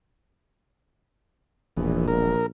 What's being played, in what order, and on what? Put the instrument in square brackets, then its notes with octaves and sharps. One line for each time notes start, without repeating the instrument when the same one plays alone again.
[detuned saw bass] E1 [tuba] A#1 [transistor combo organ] E2
[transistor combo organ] A#4